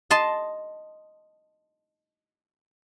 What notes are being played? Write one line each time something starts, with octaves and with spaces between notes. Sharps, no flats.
D#5 A5 C6